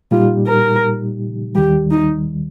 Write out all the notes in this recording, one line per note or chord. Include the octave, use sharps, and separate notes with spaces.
A#2 G3 D#4 F4 G4
A#4
D#2 D#3 G3 G4
D#4